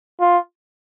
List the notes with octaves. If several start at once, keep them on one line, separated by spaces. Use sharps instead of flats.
F4